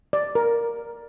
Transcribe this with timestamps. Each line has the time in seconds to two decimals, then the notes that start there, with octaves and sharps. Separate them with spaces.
0.13 D5
0.35 A#4